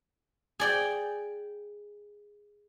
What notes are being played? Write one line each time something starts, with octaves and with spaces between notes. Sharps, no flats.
G#4 D5 G5